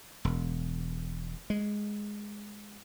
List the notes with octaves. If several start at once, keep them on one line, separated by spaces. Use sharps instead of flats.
E1
G#3